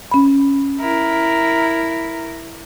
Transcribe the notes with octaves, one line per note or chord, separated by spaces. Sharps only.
C#4 B5
E4 A#4